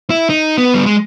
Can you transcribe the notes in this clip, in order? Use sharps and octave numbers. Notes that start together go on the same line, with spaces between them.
E4
D#4
B3
G3
G#3